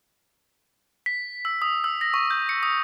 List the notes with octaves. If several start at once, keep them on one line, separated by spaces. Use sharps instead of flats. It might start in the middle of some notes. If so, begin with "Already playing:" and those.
B6
E6
D#6
E6
A#6
C#6
G6
C#7
D#6